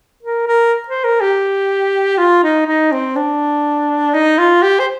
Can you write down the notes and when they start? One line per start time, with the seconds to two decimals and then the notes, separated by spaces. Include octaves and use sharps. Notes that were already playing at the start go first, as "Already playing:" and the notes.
0.23 A#4
0.48 A#4
0.88 C5
1.04 A#4
1.21 G4
2.18 F4
2.43 D#4
2.67 D#4
2.92 C4
3.16 D4
4.14 D#4
4.38 F4
4.62 G4
4.80 C5